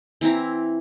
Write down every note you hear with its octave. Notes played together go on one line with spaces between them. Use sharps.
E3 C4 E4 A#5